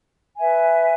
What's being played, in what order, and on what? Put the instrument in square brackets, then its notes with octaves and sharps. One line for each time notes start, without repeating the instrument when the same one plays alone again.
[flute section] B4 E5 G#5